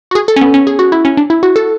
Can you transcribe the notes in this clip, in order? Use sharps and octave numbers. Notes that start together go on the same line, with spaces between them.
F#4
G#4
A4
C#4
B3
C#4
G#4
F#4
E4
C#4
D4
E4
F#4
A4